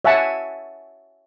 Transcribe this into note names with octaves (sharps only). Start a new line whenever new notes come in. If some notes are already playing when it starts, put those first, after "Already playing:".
C#5 E5 F#5 G#5 A5